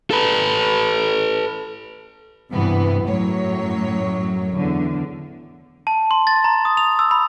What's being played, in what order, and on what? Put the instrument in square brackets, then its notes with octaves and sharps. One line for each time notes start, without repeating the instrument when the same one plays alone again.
[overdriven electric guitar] A4 B4
[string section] G2 C3 E3 B3
F#2 A2 F#3 C#5
E2 D3
[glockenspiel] A5
C6
A6
A#5
D#6
F7
E6
B5